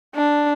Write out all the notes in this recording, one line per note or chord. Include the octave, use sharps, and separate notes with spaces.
D4